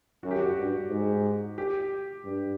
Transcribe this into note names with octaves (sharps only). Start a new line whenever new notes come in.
F#2 F#4
G4
F#4
G2
G#2
G4
G2